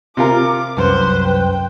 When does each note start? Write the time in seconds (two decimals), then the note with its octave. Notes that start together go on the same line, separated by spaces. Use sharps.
0.17 C3 F4 A#4 D6
0.77 C2 F#2 B4 C5
1.25 G5